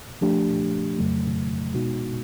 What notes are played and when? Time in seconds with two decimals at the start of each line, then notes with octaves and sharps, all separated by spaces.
0.21 F3 A3 D4 G4
0.98 F2 C#3 F#3 A3
1.74 B2 G#3 B3 D#4 F#4